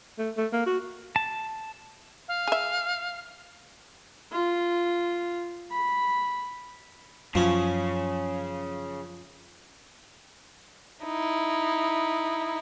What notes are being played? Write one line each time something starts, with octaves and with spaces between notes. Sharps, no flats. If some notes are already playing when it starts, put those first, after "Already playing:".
A3
A3
A#3
F#4
A5
F5
G#4 E5
F4
B5
F#2 C#3 F3 C#4
D#4 E4